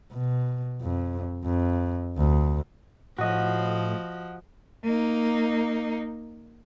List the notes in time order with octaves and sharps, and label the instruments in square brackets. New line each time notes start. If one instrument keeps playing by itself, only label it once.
[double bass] B2
F2
F2
D2
[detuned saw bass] A2 [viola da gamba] F3 [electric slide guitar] F#4 D#5
[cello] A#3 D#4